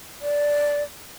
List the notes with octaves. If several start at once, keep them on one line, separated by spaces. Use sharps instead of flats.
D5